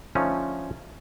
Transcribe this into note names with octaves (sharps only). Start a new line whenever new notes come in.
D3 F3 A3 C#4 D#4